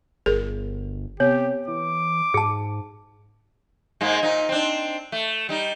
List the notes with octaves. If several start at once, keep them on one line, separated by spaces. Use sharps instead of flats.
G1 G#4 A#4
C3 B3 G4 C#5
E3 D6
G#2 G#4 A5
G#2 G#3 A#3
A#2 D#4
C4 D4
A3
G3 D#4